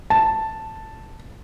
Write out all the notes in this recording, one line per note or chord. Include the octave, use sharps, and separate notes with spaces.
A5